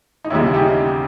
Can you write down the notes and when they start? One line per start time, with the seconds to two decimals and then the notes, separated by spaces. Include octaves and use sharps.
0.25 D#4
0.30 E1 D#2 C#3 G3 C#4 E4
0.54 D#4 G4